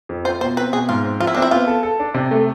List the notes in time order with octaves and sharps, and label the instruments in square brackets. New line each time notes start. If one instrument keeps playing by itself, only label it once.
[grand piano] F2
[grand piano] F4 [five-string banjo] C5
[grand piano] B2 [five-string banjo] C5
[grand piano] C4 [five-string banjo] B4
[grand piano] B2 [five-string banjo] G#4
[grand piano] G#2 [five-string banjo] F4
[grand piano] C4
[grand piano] F3 [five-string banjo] F4
[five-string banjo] E4
[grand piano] C4 [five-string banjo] D4
[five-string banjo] E4
[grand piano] B3 [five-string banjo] F4
[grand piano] A4
A4
D4
C3
A3